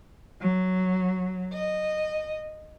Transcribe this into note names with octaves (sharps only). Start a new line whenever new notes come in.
F#3
D#5